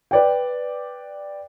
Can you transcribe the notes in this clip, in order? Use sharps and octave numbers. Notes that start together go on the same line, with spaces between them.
B4 D5 G5